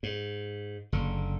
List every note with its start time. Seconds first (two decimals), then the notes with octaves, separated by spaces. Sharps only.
0.03 G#2
0.92 F#1 D3